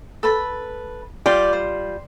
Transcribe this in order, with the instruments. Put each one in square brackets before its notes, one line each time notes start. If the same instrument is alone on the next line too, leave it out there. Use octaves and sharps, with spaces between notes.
[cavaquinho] A4 B4 B5
[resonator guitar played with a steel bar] G3 F4 G5 [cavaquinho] D5
[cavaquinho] C5